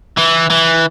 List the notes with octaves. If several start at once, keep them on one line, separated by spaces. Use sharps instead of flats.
E3
E3